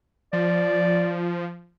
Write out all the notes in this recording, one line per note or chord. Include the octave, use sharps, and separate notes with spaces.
F3 D5